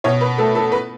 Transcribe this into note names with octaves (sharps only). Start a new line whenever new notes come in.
B2 C#5
B4
A3 A4
A4
B4